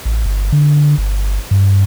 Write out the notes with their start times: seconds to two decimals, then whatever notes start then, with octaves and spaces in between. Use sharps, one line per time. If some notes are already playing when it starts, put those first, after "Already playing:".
0.05 A1
0.26 G1
0.52 D3
0.98 G1
1.51 G2